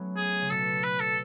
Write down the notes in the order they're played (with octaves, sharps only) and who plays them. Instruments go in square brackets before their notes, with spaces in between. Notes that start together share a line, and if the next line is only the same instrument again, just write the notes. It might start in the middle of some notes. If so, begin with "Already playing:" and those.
Already playing: [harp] F#3 A3 B3 C#4
[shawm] G#4
[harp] C#3
[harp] B2 [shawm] A4
[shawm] B4
A4